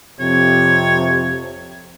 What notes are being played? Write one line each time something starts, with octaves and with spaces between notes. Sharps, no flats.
F2 C3 C#5